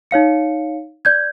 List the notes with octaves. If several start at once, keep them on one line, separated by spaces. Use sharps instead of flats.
D#4 C#5 F5 C#7
D5 G6 G#6